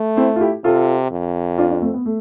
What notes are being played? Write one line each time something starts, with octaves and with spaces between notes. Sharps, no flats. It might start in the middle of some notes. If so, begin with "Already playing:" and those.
Already playing: A3
C4 E4
F4
E4 G4
C3 F4 A4
F2
D4 F4
D4 F4
A3 C4
B3
A3